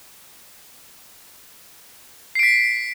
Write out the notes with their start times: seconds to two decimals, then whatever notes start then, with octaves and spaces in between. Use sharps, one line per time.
2.35 C7
2.39 D7
2.43 B6